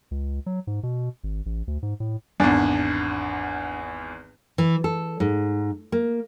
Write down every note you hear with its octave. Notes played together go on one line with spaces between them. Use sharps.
C#2
F#3
G#2
B2
G#1
A1
D2
G#2
A2
G#1 E2 D4
E3
A4
G#2
A#3